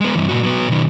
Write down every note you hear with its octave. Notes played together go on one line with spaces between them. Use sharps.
G#3 B3
G2 E3
A#2 F#4
F#3 B3
B2 D#3